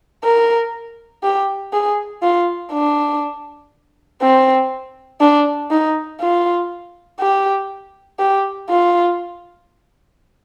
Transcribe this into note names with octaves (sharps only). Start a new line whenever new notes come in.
A#4
G4
G#4
F4
D4
C4
D4
D#4
F4
G4
G4
F4